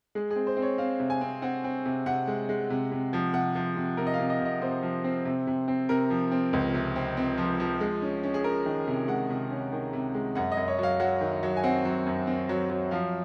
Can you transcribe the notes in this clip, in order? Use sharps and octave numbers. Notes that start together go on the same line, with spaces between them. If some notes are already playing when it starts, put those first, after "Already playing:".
G#3 G#4
G#4
C4
C5
C4
C#5
C4 F5
C3
G#5
C4
C4 F#5
C4
C3
C3 F#5
G#3
G#3
C3
C3
F3
C3 F#5
F3
C3
C3 A#4
D#5
F5
C3
D#5
C3 D#5
C3 C5
F3
C4
C3
C3
C4
C3 A#4
F3
C4
C#2
C3
C4
C4
F3
F3
G#3
C#4
C#4
G#4
C#4 A#4
D#3
C3
G#3 F#5
C3
C#4
D#3
C3
G#3
F#2 F#5
D#5
F#2
C#5
F#3 F5
F#3 F#5
D#3
F#3
G#5
C4 F#5
F#3
F#2
C4
F#3
F#3
F3 F5